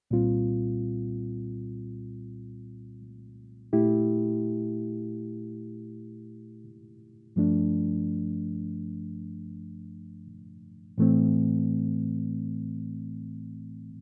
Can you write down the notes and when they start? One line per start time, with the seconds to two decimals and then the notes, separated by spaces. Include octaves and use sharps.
0.11 C2 A#2 G3 C4 F4
3.73 A#2 A3 E4 G4
7.36 G2 F3 A3 D4
10.98 A2 E3 A3 C4